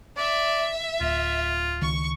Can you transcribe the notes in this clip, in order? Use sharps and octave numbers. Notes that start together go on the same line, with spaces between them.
D5 E5
D1 F4
C#2 D#3 C#6